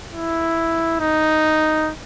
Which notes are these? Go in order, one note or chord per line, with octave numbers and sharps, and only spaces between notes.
E4
D#4